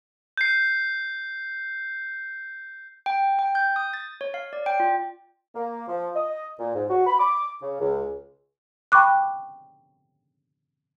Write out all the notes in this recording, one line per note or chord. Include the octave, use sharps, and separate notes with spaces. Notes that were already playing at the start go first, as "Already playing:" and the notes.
G6 C7
G5
G5
G6
D#6
A6
C#5
F5
D5
G5
F4
A#3
F3
D#5
A#2
G#2
F#4
B5
D6
C#3
C#2
G5 B5 C#6 D6 F#6